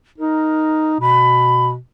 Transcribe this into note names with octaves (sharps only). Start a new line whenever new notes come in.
D#4 A#4
B2 B5